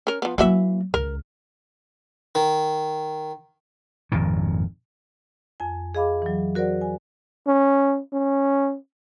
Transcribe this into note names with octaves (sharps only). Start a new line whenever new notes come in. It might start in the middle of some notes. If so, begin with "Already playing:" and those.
C#4 A#4
F3 B3
E3 F#3 A#3 F#4 E5
C#2 A#4
D#3
G#1 F2 A#2 D#3
F2 G#5
G#4 D#5 F5 B5 D6
E3 F#3
F#4 A#4 C5 D5 F#5
G#5
C#4
C#4